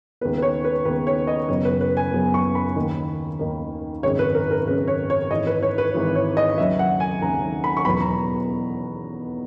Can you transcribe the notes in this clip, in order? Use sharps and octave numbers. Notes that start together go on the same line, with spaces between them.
D#2 C#3 G#3 B3 B4
B4
C#5
B4
D#2 C#3 G#3 B3 B4
C#5
D#5
F#1 F#2 C#3 F#3 B3 C#5
B4
B4
G#5
F#1 F#2 C#3 F#3 B3
C#6
B5
D#2 D#3 A#3
D#2 D#3 A#3
G#1 F#2 C#3 G#3 C#5
B4
A#4
A#4
G#1 F#2 C#3 G#3 B4
C#5
C#5
G#1 G#2 E3 D#5
B4
C#5
B4
G#1 G#2 E3
C#5
D#5
D#2 C#3 F#3 E5
F#5
G#5
D#2 C#3 F#3 A#5
B5
C#6
E2 B2 F#3 B3 B5
A#5